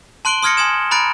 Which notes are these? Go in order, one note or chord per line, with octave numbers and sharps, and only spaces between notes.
A5 C6 F#6 D7 F#7 G7
C6 D#6 F6 G#6 A#6 C#7
G#5 C6 D#6 G#6 E7
A#5 B5 F#6 A6 D7